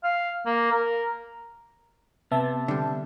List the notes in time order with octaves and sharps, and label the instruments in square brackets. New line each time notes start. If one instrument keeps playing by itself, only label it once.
[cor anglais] F5
A#3
A#4
[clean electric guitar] C3 [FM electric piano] B3 E5 A5
[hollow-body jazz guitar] D3 G3